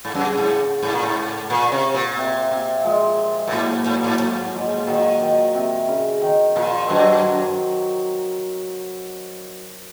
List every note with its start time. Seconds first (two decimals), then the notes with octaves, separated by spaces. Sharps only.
0.05 G#2
0.14 F#2 C#3
0.37 G#2
0.83 G#2
0.93 A#2
1.03 G#2
1.50 A#2
1.72 C3
1.94 A#2
2.17 C3
2.51 C3
2.84 F3 G#3
3.48 A#2
3.52 G#2 F#3 A#3
3.86 G#2
3.95 A#2
4.04 G#2
4.19 G#2 F#3 A#3
4.53 F3 G#3
4.87 A#2 D#3 F#3
5.21 D#3
5.54 C3
5.88 C#3
6.22 D#3
6.56 A#2 F3
6.89 F#2 D#3 F#3